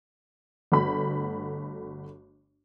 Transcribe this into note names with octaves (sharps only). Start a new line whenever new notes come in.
G1 A3 F#4 B5